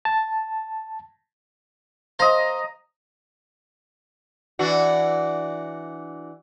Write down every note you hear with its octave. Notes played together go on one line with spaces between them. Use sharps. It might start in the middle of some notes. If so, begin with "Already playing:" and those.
A5
C5 D#5 F5 A#5
E3 D4 F#4